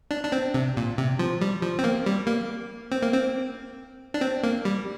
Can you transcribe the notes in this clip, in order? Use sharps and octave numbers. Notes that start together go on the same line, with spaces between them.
D4
D4
C4
C3
A#2
C3
F3
G3
F3
C4
A#3
G3
A#3
C4
A#3
C4
D4
C4
A#3
G3